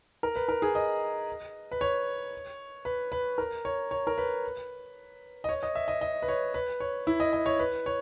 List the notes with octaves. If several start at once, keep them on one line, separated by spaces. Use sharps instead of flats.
A#4
B4
A#4
G#4
D#5
B4
C#5
B4
B4
A#4
C#5
C#5
A#4
B4
D#5
C#5
D#5
E5
D#5
D#5
B4
C#5
B4
C#5
E4
D#5
D#5
C#5
B4
C#5